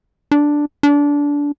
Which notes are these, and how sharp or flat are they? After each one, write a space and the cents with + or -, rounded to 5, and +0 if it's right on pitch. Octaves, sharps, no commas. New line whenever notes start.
D4 +0
D4 -20